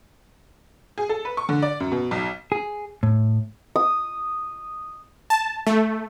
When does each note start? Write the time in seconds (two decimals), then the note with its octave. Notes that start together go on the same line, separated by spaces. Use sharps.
0.98 G#4
1.09 A4
1.25 B4
1.37 C#6
1.49 D3
1.62 D5
1.80 F#2
1.91 B2
2.11 B1
2.52 G#4
3.03 A2
3.76 D#6
5.30 A5
5.67 A3